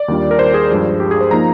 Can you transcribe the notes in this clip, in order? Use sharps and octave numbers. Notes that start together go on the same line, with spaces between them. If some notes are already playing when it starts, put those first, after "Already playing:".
Already playing: D5
D#2 D#3 G3 D4 F4
A#4
C5
G#4
G2 F3 G#3
G4
G#4
C5
F3 A#3 D#4 A#5